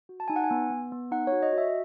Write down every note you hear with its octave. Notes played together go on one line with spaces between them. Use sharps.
F#4
A5
D#4 G#5
F#5
G#5
B3
B3
B3
D#4 F#5
C#5
F#4
D#5
F#4
E5